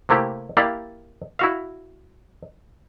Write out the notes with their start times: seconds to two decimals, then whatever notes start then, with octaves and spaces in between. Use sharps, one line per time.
0.09 C3 A3 A#3 E4 G4
0.57 A#3 E4 G4 D5 F5
1.39 E4 F#4 F5